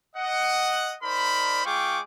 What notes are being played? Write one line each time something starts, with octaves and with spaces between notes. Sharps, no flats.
D#5 F#5
D#4 A#4 C5 D5 B5
G#3 F4 G#4 G5 C#6 D6